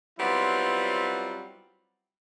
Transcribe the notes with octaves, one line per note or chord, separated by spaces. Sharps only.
F#3 G3 B3 C4 E4 F4